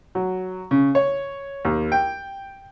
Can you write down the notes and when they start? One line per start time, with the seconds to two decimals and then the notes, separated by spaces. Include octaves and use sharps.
0.15 F#3
0.71 C#3
0.95 C#5
1.65 D#2
1.92 G5